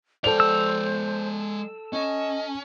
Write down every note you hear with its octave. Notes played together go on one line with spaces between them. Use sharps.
G#3 A4 C5 D5 F7
E6
C#4 D#5